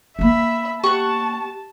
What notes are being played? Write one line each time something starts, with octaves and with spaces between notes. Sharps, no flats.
A#3 B3 E5 B5
G4 F#5 A5 C#6